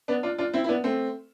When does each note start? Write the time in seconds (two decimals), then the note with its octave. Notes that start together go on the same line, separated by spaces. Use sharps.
0.08 B3 D4
0.23 D4 F4
0.38 D4 F4
0.53 C4 E4
0.64 E4
0.69 B3 D4
0.84 A3 C4